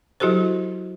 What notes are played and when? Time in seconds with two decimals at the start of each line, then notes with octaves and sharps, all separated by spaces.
0.20 F#3 E4 F#4 G4 A4 C5